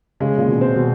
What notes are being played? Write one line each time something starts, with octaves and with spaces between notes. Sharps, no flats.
C#3 G#3
A#2
B2
C4
B2